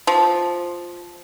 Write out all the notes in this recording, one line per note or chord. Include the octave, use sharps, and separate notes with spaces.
F3